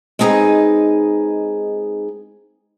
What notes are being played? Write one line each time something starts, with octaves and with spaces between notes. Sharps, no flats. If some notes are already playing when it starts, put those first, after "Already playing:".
G#3 C4 D#4 G#4 B4 D#5